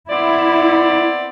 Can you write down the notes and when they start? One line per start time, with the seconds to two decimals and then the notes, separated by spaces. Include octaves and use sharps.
0.10 B3 C4 E4 D5